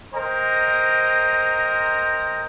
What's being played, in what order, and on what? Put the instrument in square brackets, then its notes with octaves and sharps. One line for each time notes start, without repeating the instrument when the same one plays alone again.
[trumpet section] A#4 C5 D#5 G5 A#5